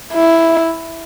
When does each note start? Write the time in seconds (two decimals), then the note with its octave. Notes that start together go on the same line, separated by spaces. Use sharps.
0.13 E4